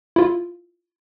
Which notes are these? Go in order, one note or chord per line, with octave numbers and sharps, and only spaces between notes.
E4 F4